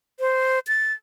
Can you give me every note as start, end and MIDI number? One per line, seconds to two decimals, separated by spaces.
0.20 0.59 72
0.68 0.92 93